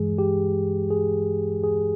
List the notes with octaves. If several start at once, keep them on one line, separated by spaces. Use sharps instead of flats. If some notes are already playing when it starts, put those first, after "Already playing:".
Already playing: G2 E3 G#3 G#4
G4
G#4
G#4